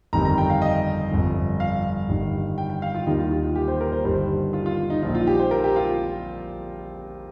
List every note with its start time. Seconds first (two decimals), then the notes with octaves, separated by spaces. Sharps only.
0.13 G1 F2 D#3 G3 A#5
0.25 A#5
0.38 G5
0.50 F5
0.62 D#5
1.11 G1 F2 F3
1.60 F5
2.09 G1 G2 D#3
2.58 G5
2.70 G5
2.82 F5
2.94 F4
3.06 D#2 D#3 G3 D#4
3.19 F4
3.31 F4
3.43 F4
3.55 G4
3.68 C5
3.81 A#4
3.92 C5
4.04 G1 G2 D#3 G3 C5
4.53 F4
4.66 F4
4.90 D#4
5.02 A#1 A#2 F3 D#4
5.15 F4
5.27 G4
5.40 C5
5.51 A#4
5.64 G4
5.76 F4